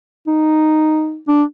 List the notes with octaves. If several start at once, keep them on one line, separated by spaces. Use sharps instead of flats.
D#4
D4